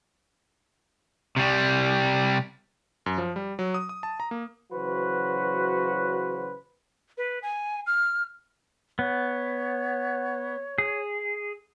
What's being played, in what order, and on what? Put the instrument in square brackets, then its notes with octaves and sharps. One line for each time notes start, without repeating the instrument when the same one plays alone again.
[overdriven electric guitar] C3 G3
[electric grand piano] F#2
F3
G3
F#3
D#6
D#6
A5
A#5
A#3
[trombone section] C#3 E3 F#3 F#4 B4 C5
[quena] B4
G#5
F6
[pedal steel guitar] B3 [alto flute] C#5
[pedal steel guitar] G#4